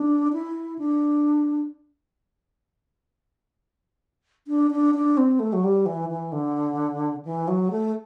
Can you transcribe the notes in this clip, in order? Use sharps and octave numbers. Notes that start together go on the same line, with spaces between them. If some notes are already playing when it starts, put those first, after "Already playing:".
Already playing: D4
E4
D4
D4
D4
D4
C4
A3
F#3
G3
E3
E3
D3
E3
F#3
A3